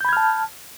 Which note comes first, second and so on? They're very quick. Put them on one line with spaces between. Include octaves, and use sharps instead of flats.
G6 B5 G#6 F6 A5